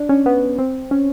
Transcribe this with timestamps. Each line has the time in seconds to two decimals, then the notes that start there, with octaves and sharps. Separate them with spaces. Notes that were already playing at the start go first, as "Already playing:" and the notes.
Already playing: D4
0.09 C#4
0.26 B3
0.59 C4
0.91 C#4